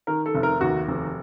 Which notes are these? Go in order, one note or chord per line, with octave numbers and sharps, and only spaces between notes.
D#3 A#4
A4
F1
A#4
D#2 F#4
F1